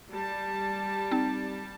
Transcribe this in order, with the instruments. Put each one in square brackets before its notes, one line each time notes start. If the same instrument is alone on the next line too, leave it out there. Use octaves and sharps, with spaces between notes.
[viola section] G3 A5
[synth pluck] C4 D#4